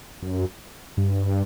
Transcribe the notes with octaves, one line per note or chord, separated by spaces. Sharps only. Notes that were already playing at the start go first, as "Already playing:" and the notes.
F#2
G2